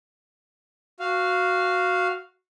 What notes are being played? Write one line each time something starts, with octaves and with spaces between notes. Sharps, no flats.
F#4 F5